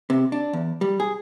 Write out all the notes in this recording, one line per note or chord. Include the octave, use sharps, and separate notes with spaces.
C3
D4
E2
G3
G#4